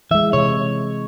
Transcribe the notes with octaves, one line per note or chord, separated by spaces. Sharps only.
E3 G#3 E5
C3 C#5